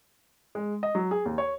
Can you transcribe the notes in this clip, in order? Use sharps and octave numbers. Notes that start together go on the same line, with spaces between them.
G#3
D#5
F#3
G#4
D#2
C#5